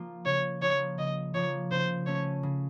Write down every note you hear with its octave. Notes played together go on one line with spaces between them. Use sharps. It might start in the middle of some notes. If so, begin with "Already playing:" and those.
Already playing: F3 A#3 F4
C#3 C#5
F3 A#3 F4 C#5
C#3 D#5
F3 A#3 F4 C#5
C#3 C5
A3 C#4 C#5
C#3